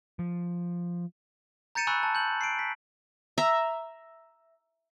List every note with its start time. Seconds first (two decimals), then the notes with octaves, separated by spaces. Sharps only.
0.19 F3
1.75 A#5 G6 A6 C#7 D#7 E7
1.87 G#5 B5 C#6 E6 F#6
2.03 A5
2.15 G6 F#7
2.41 C7 D7
2.59 B6
3.38 E5 A#5